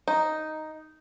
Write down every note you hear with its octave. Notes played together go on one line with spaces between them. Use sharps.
D#4